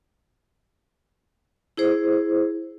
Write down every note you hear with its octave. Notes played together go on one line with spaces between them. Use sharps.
E4 G#4 C5